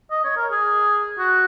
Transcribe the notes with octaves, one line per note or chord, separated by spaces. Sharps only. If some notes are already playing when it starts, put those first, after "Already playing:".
D#5
C#5
A#4
G#4
F#4